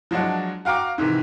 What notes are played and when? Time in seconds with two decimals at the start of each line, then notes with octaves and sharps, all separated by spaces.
0.11 F3 F#3 G#3 D4 F#4
0.65 F#4 F5 G5 A#5 D6
0.98 G#2 C3 D#3 E3